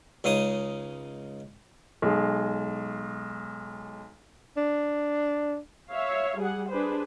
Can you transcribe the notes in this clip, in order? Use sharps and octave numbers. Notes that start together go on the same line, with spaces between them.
C#2 C#3 G#3 D#4 D#6
B1 G#3
D4
C#5 E5 F5
G3 G#4 F#5
D4 G#4 B4 C5